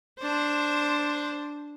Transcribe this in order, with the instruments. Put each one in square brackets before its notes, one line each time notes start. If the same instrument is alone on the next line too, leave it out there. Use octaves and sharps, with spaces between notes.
[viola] D4 C5